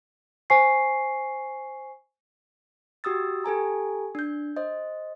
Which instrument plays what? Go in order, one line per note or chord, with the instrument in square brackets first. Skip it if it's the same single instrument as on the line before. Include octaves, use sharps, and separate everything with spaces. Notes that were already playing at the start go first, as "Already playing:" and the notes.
[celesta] C5 G#5 C#6 C7
[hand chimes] F#4 G4 D#6 E6 A6
G4 A4 G#5 A#5
D4 G6
C5 D#5